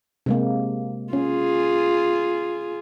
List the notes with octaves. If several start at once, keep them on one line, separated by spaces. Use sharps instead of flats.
C3 G#3 A#3
C#4 F4 G#4